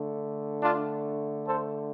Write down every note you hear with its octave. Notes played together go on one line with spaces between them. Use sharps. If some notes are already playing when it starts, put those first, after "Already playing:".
Already playing: D3 A3
D4 F4
A4 C5